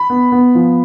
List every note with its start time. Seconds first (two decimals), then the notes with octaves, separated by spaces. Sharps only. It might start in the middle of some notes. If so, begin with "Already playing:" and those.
Already playing: B5
0.10 B3
0.32 B3
0.55 F3